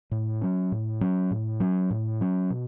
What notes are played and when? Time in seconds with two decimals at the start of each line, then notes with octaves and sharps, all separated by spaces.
0.11 A2
0.42 F#3 C#4
0.72 A2
1.01 F#3 C#4
1.31 A2
1.60 F#3 C#4
1.91 A2
2.21 F#3 C#4
2.50 B2